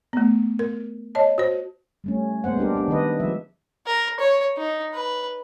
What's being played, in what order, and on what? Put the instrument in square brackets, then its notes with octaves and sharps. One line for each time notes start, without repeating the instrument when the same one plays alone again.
[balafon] A3 B3
A#4
C#5 D#5 A5
F#4 C5
[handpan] G3 A3 C#4
G#3 A#3 B3 C5 F#5
G3 D4 G4 A#4
B3 D4
D#3 D#4 B4 D#5
F3 G#3 E5
[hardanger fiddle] A#4
C#5
D#4
B4